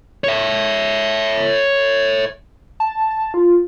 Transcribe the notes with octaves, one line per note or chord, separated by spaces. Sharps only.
C#5 E5
A5
A5
F4